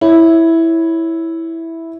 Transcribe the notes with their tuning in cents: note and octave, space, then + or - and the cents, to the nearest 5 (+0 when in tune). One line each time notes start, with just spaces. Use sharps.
E4 -5 C#5 +0